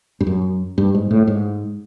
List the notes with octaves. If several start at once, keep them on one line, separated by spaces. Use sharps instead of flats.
G2
F#2
G2
G#2
A2
G#2